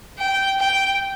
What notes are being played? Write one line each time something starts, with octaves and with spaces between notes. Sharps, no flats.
G5
G5